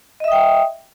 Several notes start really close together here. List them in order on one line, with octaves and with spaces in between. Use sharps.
D#5 E5 D#6 G5